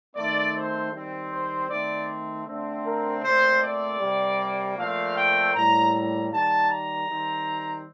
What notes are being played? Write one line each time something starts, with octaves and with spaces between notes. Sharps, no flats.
D#3 A3 C4 D5
C5
D#3 G3 C4
C5
D#3 A3 C4 D5
D3 A3 C4
A#4
A#2 A3 C4 C5
D5
C3 G3 A#3
A#2 F3 A3 C4 F5
G5
A2 G3 A#3 A#5
A#5
D#3 G3 A#3 A5
A#5
D#3 G3 C4